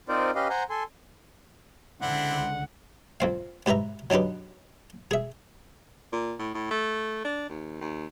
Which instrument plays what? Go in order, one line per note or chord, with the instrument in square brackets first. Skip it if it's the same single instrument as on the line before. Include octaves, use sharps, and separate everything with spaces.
[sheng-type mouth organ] C4 D#4 F4 A#4 C5 D5
C#4 G4 B4 D#5 F5
C5 F#5 G#5 A#5 C6
A4 G#5 C6
[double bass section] C#2 D3 [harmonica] C4 D4 E4 [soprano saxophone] F#5
[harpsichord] F2 C4 F5
G#2 G4 B4 E5 A#5
F#3 D4 D#4 G4 B4
G#4 E5
[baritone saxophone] A#2
A2
A2
A3
D4
D#2
D#2